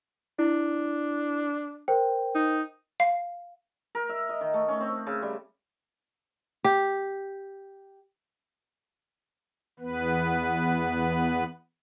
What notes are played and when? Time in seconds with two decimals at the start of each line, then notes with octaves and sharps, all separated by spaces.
0.39 D4 E4
1.88 A#4 C5 G5
2.35 D#4
3.00 F5
3.95 A#4
4.09 E5
4.29 D#5
4.41 D#3
4.54 A3
4.68 C#4
4.80 C4
5.06 C#3
5.22 G3
6.64 G4
9.80 E2 B3 B4